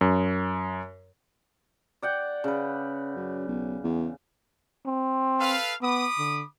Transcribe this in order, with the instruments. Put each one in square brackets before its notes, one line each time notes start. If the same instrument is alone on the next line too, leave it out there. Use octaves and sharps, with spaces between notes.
[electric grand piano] F#2
[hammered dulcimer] D5 F#5 G5
C#3 B4
[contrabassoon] F#2
B1
E2
[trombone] C4
[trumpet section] A4 B4 F5
[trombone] B3 [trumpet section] B5 D6 D#6
[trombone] D3